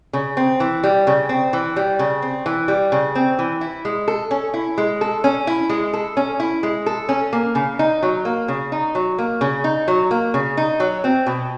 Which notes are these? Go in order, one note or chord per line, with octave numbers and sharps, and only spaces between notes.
C#3
C4
E3
G3
C#3
C4
E3
G3
C#3
C4
E3
G3
C#3
C4
E3
E4
G#3
A4
C#4
E4
G#3
A4
C#4
E4
G#3
A4
C#4
E4
G#3
A4
C#4
A#3
C#3
D#4
F#3
A#3
C#3
D#4
F#3
A#3
C#3
D#4
F#3
A#3
C#3
D#4
F#3
C4
B2